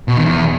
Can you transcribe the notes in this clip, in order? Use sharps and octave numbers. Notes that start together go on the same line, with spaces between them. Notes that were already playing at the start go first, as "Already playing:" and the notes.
B2
D#3
E2